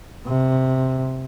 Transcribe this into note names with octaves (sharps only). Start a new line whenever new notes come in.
C3